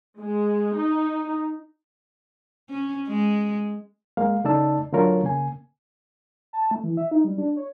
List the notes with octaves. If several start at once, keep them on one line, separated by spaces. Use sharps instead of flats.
G#3
D#4
C#4
G#3
G#3 A#3 F5
C#3 A3 D#4 D5 A5 E6
D3 F#3 A3 F4 A#4 C#5
C#3 A#3 G#5
A5
A3
E3
E5
D#4
G3
D4
C#5